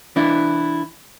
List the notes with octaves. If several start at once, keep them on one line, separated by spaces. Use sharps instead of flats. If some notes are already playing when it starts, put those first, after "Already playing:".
E3 D4 E4